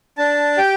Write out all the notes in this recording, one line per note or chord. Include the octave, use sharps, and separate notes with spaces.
D4 A5
G4 G5